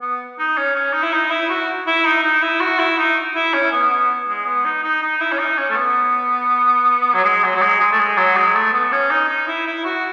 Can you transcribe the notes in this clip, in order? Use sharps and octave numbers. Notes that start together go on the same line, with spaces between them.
B3
D#4
C#4
C#4
D#4
E4
D#4
E4
F#4
E4
D#4
D#4
E4
F#4
E4
D#4
E4
C#4
B3
B3
G#3
B3
D#4
D#4
D#4
E4
C#4
D#4
C#4
A3
B3
F#3
G#3
F#3
F#3
G#3
G#3
A3
G#3
F#3
G#3
A3
B3
B3
C#4
D#4
D#4
E4
E4
F#4